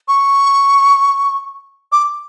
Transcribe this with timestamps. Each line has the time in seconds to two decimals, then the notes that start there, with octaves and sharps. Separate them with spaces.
0.08 C#6
1.92 D6